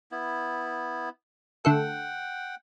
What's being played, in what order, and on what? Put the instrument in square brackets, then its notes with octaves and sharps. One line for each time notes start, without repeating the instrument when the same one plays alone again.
[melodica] B3 E4
[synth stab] D3 A3 A4 [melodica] F#5 G5